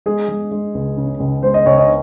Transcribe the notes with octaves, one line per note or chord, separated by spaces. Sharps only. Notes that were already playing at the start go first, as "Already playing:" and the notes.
G#3 G#4
G#3
G#3
C#2
C#3
C#2
G#3 C5
D#5
C#2 C#5
D#5